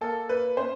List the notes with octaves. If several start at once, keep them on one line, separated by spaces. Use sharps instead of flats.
A#3 A4
A#3 B4
C#4 C5